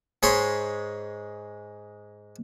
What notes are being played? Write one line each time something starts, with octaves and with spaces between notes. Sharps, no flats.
G#2 G#3 C#5 B5 C6